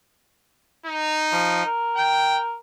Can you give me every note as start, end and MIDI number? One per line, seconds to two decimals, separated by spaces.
0.86 1.66 63
1.32 1.65 53
1.65 2.56 70
1.97 2.39 79